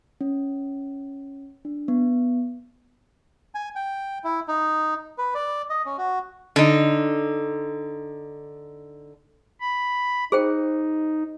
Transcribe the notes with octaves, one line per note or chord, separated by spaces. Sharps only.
C#4
D4
B3
G#5
G5
E4
D#4
B4
D5
D#5
C#4
F#4
D3 D#4
B5
D#4 G#4 C5 G5